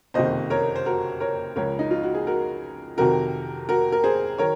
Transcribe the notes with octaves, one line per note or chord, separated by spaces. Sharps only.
F#1 F2 C3 D#3 C5 D#5
A#4 C#5
C5
F#4 A#4
A#4 C#5
C#2 C#3 F3 A#4 C#5
D#4
F4
F#4
G#4
F#4 A#4
F2 C3 D#3 F#3 F#4 A#4
F#4 A#4
A#4
G#4 C5
D#3 F#3 A#4 C#5